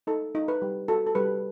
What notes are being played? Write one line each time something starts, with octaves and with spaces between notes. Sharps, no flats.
D#4 A4
D#4
B4
G3
F#4 A4
A4
G3 B4